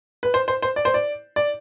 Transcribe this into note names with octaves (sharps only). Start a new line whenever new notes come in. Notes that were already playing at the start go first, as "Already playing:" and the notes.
B4
C5
C5
C5
D5
C5
D5
D5